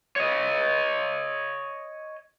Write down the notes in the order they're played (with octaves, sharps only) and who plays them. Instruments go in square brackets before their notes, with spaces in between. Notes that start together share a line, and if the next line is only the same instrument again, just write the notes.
[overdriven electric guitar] C#5 D#5